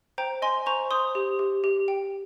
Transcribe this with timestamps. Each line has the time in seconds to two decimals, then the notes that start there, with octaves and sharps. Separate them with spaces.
0.18 C5 G5 A#5
0.42 D#5 G#5 C6
0.66 C5 A#5 C#6
0.91 C5 C6 D#6
1.15 G4
1.39 G4
1.64 G4
1.88 G5